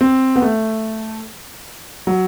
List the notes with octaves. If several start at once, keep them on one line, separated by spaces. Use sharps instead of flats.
C4
B3
A3
F#3